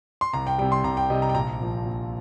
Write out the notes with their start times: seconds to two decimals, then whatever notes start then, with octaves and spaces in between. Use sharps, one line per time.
0.21 C6
0.33 C2 A#5
0.47 G5
0.58 C3 G3 G5
0.72 C6
0.84 C2 A#5
0.97 G5
1.10 C3 G3 D#5
1.22 A#5
1.29 G5
1.35 A#1 A#5
1.61 A#2 F3
1.85 A#1